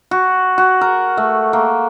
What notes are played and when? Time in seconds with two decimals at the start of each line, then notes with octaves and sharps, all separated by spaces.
0.11 F#4
0.58 F#4
0.81 A#4
1.17 A3
1.53 A#3